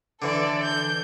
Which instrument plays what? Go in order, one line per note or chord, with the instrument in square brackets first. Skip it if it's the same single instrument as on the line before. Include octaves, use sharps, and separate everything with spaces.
[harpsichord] D3 E3 [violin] A4 D5
[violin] G6